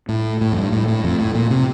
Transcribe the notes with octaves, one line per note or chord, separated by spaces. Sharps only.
A2
A2
F2
G2
A2
A2
F2
A2
A#2
C3